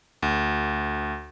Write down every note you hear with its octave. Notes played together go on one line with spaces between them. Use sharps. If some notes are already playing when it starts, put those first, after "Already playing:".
D2